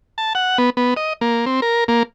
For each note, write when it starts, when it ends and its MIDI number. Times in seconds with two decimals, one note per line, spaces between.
0.18 0.33 81
0.35 0.58 78
0.58 0.70 59
0.77 0.94 59
0.97 1.13 75
1.21 1.45 58
1.46 1.60 60
1.62 1.84 70
1.88 2.03 58